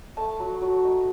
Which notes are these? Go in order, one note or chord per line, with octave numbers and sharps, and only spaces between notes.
A3 A5
F#3
F#3
D#4